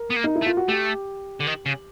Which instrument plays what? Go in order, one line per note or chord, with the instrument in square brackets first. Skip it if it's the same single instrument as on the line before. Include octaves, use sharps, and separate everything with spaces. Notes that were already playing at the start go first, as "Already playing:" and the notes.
Already playing: [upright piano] A#4
[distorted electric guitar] B3
A#3
[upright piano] D#4
E4
[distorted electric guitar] A3
[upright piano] F4
F#4
[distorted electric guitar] A3 [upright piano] G4
[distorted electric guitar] D3
D#3
C#3